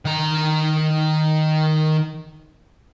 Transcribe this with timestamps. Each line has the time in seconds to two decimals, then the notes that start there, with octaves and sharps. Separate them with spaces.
0.05 D#3 A#5